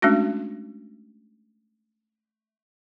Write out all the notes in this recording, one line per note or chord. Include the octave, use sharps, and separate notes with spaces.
G#3 A3 C#4 D4 F#4